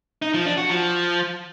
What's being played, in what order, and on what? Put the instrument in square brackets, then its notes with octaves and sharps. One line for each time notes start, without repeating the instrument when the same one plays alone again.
[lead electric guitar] D#4
F3
D4
F#4
F3